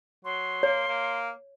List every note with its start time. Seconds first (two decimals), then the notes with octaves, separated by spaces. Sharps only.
0.25 F#3 C6
0.63 A#3 C#5
0.88 A#3